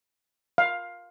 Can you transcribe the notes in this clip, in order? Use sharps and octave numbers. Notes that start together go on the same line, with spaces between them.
F5